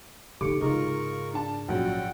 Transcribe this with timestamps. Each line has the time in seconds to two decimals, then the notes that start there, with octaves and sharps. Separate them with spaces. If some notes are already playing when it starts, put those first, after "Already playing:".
0.41 D3 D#4 G4 A4 D6 C#7
0.61 G#2 C#3 D#4 F4 G#4 A#4 C#6
1.33 D4 A5
1.68 A#1 F#3 C#4 F#5 G5